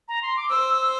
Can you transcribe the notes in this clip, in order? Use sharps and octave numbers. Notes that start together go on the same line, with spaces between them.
A#5
C6
D6
C5 E6
E6